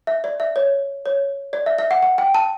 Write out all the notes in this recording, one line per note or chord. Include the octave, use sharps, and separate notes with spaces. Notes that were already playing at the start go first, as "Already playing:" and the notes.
E5
D5
E5
C#5
C#5
D5
E5
E5
F#5
F#5
G5
A5